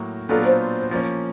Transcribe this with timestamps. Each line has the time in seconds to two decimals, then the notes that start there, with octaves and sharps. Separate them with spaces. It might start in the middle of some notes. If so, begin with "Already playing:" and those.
Already playing: A2 F#3 A#3
0.29 A#2 F#3 B3 D4 F4 A4
0.45 C5
0.91 F3 A#3 C#4